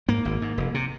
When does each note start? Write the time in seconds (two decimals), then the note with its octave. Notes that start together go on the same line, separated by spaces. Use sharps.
0.08 G#2 A#3
0.25 G#1
0.42 G#2
0.58 F1
0.74 C3